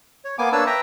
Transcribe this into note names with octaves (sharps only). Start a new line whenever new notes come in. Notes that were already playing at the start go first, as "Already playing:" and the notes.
C#5
A#3 B3 G#5 D6
A#3 D4 B4 C#5 A5 E6
B4 E5 G5 A#5